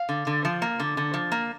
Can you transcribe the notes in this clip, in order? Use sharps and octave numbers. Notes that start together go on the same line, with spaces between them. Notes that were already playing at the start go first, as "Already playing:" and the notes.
Already playing: F5
D3
D3
F3
A#3
D3
D3
F3
A#3